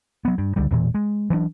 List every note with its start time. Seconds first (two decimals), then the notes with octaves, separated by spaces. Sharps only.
0.25 F#3 B3
0.38 G2
0.56 C#2 D3 G3
0.71 E1 A#2 E3
0.94 G#3
1.30 E3 F#3 C4 D4